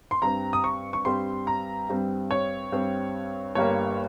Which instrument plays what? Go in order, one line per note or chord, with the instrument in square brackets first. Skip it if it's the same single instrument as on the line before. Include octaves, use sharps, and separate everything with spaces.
[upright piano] C6
G2 G3 C4 A#5
D#6
C#6
C#6
G2 G3 C4 C6
A#5
G2 G3 C4
C#5
G2 G3 C4
G1 G2 G3 A#3 C#5